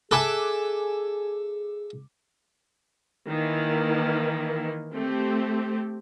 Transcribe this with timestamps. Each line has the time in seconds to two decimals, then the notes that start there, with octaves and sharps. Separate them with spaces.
0.11 G#4 A4 E5 G#5 D6 F#6
3.28 D#3 E3 A#3 E4
4.93 A3 C4 G4